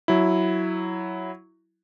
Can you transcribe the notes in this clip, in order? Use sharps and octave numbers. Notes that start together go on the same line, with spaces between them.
F#3 E4